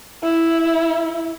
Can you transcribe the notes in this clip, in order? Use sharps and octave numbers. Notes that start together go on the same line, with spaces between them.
E4